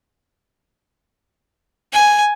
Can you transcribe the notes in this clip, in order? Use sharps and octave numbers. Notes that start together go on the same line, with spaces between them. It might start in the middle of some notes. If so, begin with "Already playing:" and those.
G#5